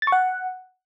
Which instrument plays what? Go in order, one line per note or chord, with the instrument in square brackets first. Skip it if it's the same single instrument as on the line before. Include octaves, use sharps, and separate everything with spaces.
[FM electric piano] A6
C#6
F#5